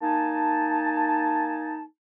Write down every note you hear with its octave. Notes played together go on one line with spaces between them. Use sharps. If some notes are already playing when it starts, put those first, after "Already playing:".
A#3 D#4 G#5 A5